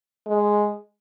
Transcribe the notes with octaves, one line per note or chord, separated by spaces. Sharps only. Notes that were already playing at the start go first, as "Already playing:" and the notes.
G#3